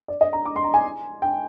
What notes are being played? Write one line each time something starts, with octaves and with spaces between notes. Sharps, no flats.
D5
D#5
A#5
D6
C6
A#5
G#5
G5